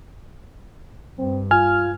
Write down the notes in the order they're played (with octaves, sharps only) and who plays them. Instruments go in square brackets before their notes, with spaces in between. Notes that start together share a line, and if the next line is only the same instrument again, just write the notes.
[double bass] G2 [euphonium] C4
[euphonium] F4 [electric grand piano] G#5 [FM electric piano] F6